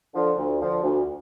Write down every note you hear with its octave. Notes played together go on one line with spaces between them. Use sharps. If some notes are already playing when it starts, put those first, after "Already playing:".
D3 F3
D2
D3 F3
D2